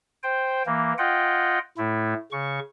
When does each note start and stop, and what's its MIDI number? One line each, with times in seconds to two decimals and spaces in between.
0.23 0.63 72
0.23 0.63 79
0.66 0.93 52
0.66 0.93 58
0.98 1.59 65
0.98 1.59 75
0.98 1.59 78
0.98 1.59 79
1.78 2.14 45
1.78 2.14 57
1.78 2.14 64
2.32 2.59 49
2.32 2.59 85